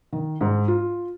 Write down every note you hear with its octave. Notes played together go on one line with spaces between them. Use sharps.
D#3
G#2
F4